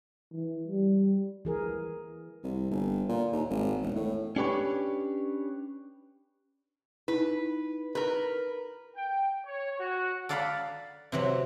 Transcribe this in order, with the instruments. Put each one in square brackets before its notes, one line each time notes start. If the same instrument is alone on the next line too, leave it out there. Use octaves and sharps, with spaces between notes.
[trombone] E3
G3
[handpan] E3 G#4 A#4
[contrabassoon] C2
G1
A#2
D#2
G#1
E1
A2
[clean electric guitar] C#4 D4 G4 B4 C#5
[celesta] D#4 E4 [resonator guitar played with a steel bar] B4
[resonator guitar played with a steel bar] A#4 B4
[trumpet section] G5
C#5
F#4
[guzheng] A4 D5 F5 F#5 A#5 B5
C3 E3 F#3